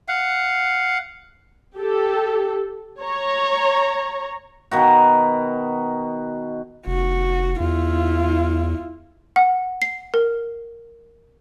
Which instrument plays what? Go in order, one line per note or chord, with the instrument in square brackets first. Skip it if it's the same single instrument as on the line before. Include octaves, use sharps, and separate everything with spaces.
[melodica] F5 F#5
[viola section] G4 A4
C#5 A#5
[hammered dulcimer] B2 D#3 F#4
[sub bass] F1 [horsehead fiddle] F#4
[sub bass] E2 [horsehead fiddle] E4 F4
[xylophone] F#5
C7
A#4